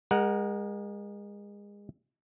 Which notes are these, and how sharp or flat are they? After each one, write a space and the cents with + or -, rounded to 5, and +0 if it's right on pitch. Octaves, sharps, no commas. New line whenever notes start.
G#3 -30 A#4 +20 F#5 +5